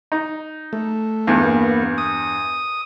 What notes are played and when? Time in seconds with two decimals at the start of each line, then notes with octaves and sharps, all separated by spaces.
0.12 D#4
0.73 A3
1.27 E2 G2
1.43 A#3 B3
1.98 D#6